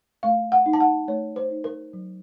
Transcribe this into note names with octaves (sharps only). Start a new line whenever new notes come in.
A3 F5
F#5
D#4
A5
F#5
A3 C#5
C5
D#4
A#4
F#3